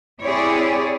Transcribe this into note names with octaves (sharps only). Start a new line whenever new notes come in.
C4 E4 G4 G#4 C#5 D5